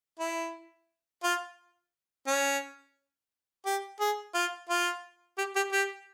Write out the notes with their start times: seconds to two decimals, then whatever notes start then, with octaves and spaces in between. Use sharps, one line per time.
0.20 E4
1.23 F4
2.27 C#4
3.66 G4
4.00 G#4
4.34 F4
4.69 F4
5.38 G4
5.56 G4
5.72 G4